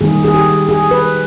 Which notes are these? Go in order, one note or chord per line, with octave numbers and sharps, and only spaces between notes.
D#3 G3 A#3 D#4 G#4
G#4
G4
G#4
B4